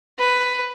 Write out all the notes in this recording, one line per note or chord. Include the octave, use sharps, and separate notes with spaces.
B4